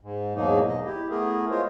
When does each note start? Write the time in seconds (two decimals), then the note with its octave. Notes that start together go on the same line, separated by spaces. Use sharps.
0.01 G#2
0.35 E2 G#2 B2 F#3 A#3 D#4
0.67 D#5
0.85 E4 G4
1.10 A3 B3 E4 G#4 A#4
1.50 G#3 F4 A#4 C5 C#5